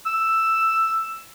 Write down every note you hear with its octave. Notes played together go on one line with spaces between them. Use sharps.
E6